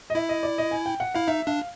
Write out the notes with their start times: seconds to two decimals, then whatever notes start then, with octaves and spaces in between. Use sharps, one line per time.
0.10 D#5
0.15 E4 E5
0.29 D#5
0.43 D5
0.58 D#5
0.71 G#5
0.86 G5
1.00 F#5
1.15 E4 F5
1.27 D#4 E5
1.47 D4 F5